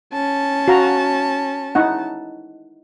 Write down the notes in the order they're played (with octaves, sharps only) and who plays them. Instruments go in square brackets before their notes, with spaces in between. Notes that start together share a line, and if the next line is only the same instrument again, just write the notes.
[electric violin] C#4 A5
[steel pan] F#4 F5 A#5
D#4 E4 F#5